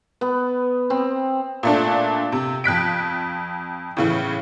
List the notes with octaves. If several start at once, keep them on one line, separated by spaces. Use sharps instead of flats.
B3
C4
A#2 A3 D4
C3
F2 F#6 B6 D7
A2 C#3 E3